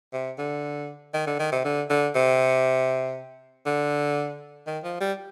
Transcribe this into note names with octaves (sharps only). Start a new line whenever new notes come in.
C3
D3
D#3
D3
D#3
C3
D3
D3
C3
D3
D#3
F3
G3